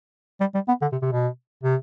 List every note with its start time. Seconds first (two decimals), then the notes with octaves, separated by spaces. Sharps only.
0.40 G3
0.54 G3
0.68 B3
0.82 D3
0.92 C3
1.02 C3
1.12 B2
1.63 C3